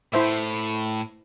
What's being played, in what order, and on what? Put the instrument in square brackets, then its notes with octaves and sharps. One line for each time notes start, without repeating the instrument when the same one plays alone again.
[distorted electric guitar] A2 [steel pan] E4 C5 E5